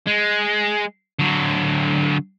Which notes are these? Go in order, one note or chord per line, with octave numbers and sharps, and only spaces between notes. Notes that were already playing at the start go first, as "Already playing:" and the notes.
G#3
D3 F#3